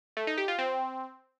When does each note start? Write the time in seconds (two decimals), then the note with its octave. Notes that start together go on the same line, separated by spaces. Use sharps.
0.17 A3
0.27 D#4
0.38 G4
0.48 F4
0.58 C4